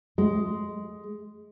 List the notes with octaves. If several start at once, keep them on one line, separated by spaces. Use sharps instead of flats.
G#3